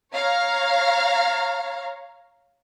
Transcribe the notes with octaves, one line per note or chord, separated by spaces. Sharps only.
C#5 F5 A#5